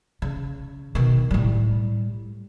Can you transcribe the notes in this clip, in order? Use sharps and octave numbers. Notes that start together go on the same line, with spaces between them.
C#3
B2 D#3
A2 G3